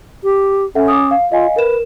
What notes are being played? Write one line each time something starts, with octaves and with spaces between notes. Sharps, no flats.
G4
C#4 A4 E5 F#5
D6 D#6
F5
F4 D#5 F5 G#5
A#4 B4 E7